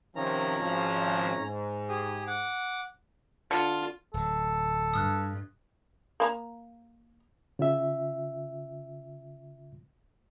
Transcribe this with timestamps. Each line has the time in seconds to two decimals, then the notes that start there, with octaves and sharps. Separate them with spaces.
0.16 C3 D#3 F3 C#4 A#5
0.59 G#1 F3
1.38 G#2
1.89 G4 G#4 D#6
2.27 F#5 D6
3.51 D3 F4
4.14 D1 F#3 A4
4.94 G2 D#6 F6 F#6
6.20 A#3 B4 A#5
7.59 C#3 F4 E5